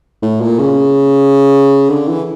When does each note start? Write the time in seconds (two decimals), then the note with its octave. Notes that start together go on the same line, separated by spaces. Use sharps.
0.22 A2
0.41 A#2
0.59 C#3
1.89 D3
2.08 E3